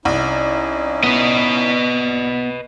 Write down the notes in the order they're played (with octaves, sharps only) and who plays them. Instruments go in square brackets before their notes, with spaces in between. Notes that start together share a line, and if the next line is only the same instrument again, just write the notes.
[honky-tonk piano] C2 [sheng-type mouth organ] C#4 D#4 E4
[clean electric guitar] B3 [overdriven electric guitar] B4 D#5